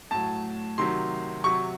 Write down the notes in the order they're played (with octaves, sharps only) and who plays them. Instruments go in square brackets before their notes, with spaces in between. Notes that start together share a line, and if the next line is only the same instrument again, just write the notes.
[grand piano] A2 F#3 A5
C3 D#3 F#3 C6
C3 F#3 C#6